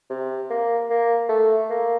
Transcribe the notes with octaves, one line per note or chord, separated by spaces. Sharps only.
C3
A#3
A#3
A3
A#3